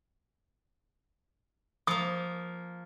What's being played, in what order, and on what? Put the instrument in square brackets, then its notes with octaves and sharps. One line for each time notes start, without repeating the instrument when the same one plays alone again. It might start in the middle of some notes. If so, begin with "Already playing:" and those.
[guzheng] F3 A#3 [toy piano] D#6